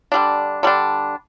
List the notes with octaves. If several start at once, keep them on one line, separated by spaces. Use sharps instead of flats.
D3 G3 D4
D3 G3 D4